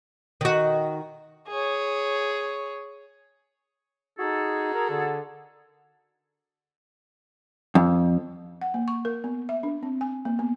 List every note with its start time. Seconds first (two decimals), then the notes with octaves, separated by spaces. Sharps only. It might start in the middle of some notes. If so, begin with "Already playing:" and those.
0.41 D#3 F#4
1.48 G#4 C#5
4.19 D#4 F#4 G#4 A4
4.74 A#4
4.90 D3
7.75 F2
8.62 F#5
8.74 A#3
8.88 C#6
9.05 A#4
9.24 B3
9.49 E5
9.63 D4
9.83 C4
10.01 G#5
10.25 A#3
10.39 B3